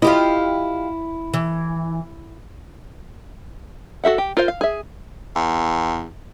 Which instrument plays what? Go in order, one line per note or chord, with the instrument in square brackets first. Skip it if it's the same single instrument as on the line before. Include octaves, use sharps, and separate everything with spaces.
[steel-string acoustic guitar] E4 [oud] F4 G4 D#5
[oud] E3
[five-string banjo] F#4 A4 E5 F#5
G4
F4 A#4 C5 F5
F5
G#4 E5
[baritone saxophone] E2